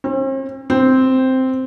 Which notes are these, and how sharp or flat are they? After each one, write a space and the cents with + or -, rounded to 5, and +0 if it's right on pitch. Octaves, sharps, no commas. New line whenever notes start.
C4 +45
C4 -5